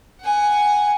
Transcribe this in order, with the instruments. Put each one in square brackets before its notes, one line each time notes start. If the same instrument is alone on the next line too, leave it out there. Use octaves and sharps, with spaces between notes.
[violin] F#5 G#5